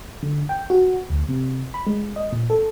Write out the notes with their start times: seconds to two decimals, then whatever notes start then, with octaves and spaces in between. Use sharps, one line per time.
0.23 D3
0.49 G5
0.70 F#4
1.10 D2
1.29 C3
1.74 B5
1.87 G#3
2.16 D#5
2.32 A#2
2.50 A4